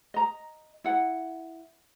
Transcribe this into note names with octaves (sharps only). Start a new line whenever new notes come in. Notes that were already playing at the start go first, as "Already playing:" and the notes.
D#5 A#5
E4 F#5